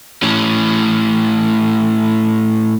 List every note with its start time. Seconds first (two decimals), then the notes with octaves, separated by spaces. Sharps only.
0.23 A2 C#4